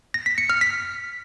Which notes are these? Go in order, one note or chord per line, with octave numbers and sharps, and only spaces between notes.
A#6
B6
C#7
F6
B6